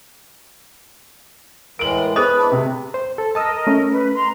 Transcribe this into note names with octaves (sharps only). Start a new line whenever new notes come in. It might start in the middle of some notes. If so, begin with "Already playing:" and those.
A2 E3 G#3 A#4 D7 F#7
G#4 B4 C5 D#5 D#6
E2 D4 E4
C3 A3
C5
A4
A#4 D#5 A5 D#6 E6
A3 C#4
B4
A#5 C6